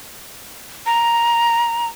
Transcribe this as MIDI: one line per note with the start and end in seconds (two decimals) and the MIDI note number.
0.86 1.87 82